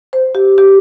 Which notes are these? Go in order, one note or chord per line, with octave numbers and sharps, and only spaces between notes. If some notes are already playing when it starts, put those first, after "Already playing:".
C5
G4
G4